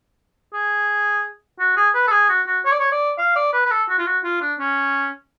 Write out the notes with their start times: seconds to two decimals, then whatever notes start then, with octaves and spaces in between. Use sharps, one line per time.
0.53 G#4
1.60 F#4
1.77 G#4
1.95 B4
2.08 A4
2.12 G#4
2.29 F#4
2.47 F#4
2.65 C#5
2.72 D5
2.79 C#5
2.92 D5
3.19 F5
3.36 D5
3.53 B4
3.66 B4
3.71 A4
3.89 F#4
3.99 F4
4.06 F#4
4.24 F4
4.41 D4
4.60 C#4